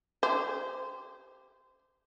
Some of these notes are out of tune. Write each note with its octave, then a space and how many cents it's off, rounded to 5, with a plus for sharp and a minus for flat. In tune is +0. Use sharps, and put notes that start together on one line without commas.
G4 +0 C5 -20